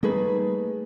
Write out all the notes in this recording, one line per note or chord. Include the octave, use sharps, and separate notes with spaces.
G3 A3 A#3 D#4 G#4 B4